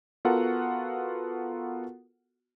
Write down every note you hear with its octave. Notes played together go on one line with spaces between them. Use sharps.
B3 F4 F#4 A4 A#4 F#5